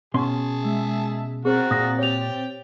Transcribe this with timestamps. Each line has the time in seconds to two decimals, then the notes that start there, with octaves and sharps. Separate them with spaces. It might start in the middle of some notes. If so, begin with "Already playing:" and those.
0.14 B2 C#4 G#4 A5 C6
0.63 G#3 E5
1.45 C4 F#4 G#4 A#4 C5 A6
1.71 A#2 D#6 A#6
1.99 G4 C#5 G5 F7